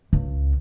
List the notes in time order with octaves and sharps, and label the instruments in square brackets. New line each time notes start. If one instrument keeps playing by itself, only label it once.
[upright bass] C#2